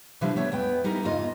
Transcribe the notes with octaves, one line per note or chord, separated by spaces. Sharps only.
C3 E3 F3 G3 D4 C5
A3 B3 C#5 D5
E2 B3 G5
G3 D#4 E4 A#4
E2 G2 C#3 A#3 F4 D#5